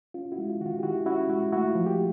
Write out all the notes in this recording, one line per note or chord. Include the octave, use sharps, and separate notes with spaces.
C#4 F4
E4 F#4
G#3
F4
D#3 F#4
F4
G4
D#3 E4 F#4
C#4 E4 F#4
G#3 E4 F#4
A3 E4 F#4
F4
F3
F4 G4